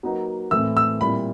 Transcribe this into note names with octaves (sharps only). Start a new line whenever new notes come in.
F#3 A#3 D#4 F#4 B4
A2 E3 A3 C4 E6
E6
A#2 G3 C4 E4 B5